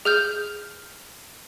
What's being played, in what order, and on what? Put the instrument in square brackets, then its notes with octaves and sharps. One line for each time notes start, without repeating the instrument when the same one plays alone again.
[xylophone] G#4 F6 G6